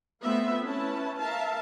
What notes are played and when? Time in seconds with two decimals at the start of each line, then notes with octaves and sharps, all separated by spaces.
0.21 A3 B3 C4 F4 B4 E5
0.63 C#4 E4 B4 A5
1.18 A#4 E5 F5 A5